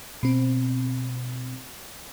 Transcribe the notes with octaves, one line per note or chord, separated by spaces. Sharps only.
B2 C4